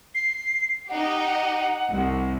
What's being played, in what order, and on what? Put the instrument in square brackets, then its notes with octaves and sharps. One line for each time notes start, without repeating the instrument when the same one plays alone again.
[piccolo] C7
[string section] D#4 G4 [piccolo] F#5
[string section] C2